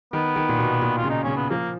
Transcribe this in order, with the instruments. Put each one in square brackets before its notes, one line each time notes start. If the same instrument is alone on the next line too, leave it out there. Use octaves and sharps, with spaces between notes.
[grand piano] D#3 [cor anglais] B3
[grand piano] D#3
A#2
B2
A#2
[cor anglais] F4
[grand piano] C#3
[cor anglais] D#4
[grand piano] C#3 [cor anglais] C#4
[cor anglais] B3
[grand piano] F3 [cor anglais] A#3